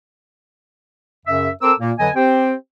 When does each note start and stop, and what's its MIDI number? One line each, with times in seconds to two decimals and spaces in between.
1.25 1.48 42
1.25 1.48 49
1.25 1.48 76
1.61 1.73 60
1.61 1.73 69
1.61 1.73 70
1.61 1.73 72
1.61 1.73 86
1.61 1.73 88
1.79 1.91 46
1.79 1.91 58
1.99 2.09 41
1.99 2.09 50
1.99 2.09 54
1.99 2.09 71
1.99 2.09 75
1.99 2.09 80
2.15 2.53 60
2.15 2.53 67
2.15 2.53 72
2.15 2.53 79